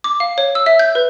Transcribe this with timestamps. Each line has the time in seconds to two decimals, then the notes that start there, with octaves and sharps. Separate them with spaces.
0.04 D6
0.20 F5
0.38 C#5
0.55 E6
0.66 E5
0.79 G6
0.95 B4